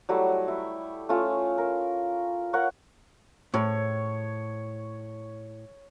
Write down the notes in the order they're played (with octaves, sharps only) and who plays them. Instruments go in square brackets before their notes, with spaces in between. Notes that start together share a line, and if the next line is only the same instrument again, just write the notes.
[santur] F#3 G3 A3 E4
E4
A3 C#4 F4
A#4
A#4 C#5 F5 F#5
[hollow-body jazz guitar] A2 [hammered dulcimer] C#5